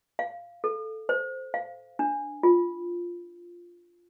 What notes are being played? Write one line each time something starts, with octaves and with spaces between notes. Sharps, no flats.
F5
A4
C5
F5
D4
F4